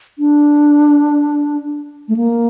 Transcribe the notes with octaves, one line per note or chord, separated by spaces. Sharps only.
D4
A3
A#3